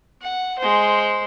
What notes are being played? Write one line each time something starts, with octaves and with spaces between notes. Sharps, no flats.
F#5
G#3 C5